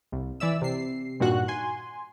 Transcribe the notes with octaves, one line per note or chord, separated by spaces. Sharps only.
C2
E3 D5 E5 E6
C3 C7
G2 A#2 D#3 F#4 F#6
G#5 C6